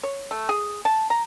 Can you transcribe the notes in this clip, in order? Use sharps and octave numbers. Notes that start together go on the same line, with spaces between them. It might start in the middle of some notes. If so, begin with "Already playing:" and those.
C#5
A3
G#4
A5
A#5